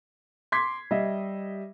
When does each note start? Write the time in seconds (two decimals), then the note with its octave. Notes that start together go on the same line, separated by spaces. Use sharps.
0.52 C6 D6 G#6 B6 C7
0.91 G3 D#5 E5